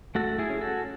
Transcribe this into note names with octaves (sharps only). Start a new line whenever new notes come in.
A3 F#4 A4
E4 G#4
C#4
F#4 A4